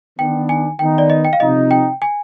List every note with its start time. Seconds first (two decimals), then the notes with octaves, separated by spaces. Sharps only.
0.19 D#3 B3 D4 G5
0.49 G#5
0.79 D#3 B3 D#4 G5
0.98 D5
1.10 D#5
1.25 G5
1.33 F5
1.40 C3 F3 C4 D#4 D#5
1.71 G5
2.02 G#5